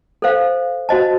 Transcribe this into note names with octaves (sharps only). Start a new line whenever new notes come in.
A4 C5 F5
F#4 C5 D#5 A5